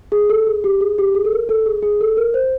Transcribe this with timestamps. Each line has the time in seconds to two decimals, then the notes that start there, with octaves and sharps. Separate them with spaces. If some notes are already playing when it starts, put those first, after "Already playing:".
0.12 G#4
0.30 A4
0.47 G#4
0.64 G4
0.81 G#4
0.98 G4
1.15 G#4
1.25 A4
1.32 A#4
1.49 A4
1.66 G#4
1.83 G#4
2.01 A4
2.17 A#4
2.34 C5